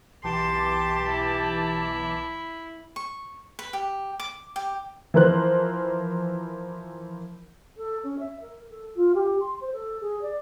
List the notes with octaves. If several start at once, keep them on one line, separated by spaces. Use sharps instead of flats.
B1 E3 G4 A5 C6 D6
E4
C#6
B4
G4
D6
G4
E3 F3 A#4 C5 F#6
A4
C#4
E5
A#4
A4
F4
G4
C6
C5
A4
G#4
D5